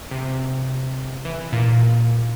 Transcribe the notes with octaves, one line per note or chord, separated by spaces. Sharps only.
C3
E3
A#2